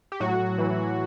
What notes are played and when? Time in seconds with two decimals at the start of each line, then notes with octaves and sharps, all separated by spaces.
0.12 G4
0.20 A2 F#3 F#4
0.58 E3